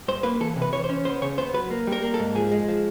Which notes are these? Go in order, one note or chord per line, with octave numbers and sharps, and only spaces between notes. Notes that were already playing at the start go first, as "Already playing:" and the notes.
G2 C5
A#3 B4
E3 A4
C3
B4
E3 C#5
C5
C#4
B3 C5
C#3 C#5
B3 C5
F#3 B4
A#3
G3
A#4
A#3
A4
G#2
F3 G#4
G#3
F3